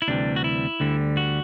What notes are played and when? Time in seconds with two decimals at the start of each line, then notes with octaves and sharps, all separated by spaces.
0.02 E4
0.08 D2 C3 E3 G3 D4
0.36 F#4
0.44 E4
0.80 D2 D3 G3
1.17 F#4